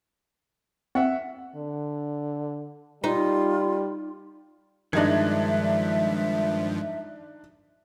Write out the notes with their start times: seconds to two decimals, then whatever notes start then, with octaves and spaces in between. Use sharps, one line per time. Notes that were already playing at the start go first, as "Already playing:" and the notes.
0.95 C4 E5 F#5
1.56 D3
3.04 G3 D#4 F4
4.93 G2 D#3 F3 G#3 D4 D#4 E5 G#6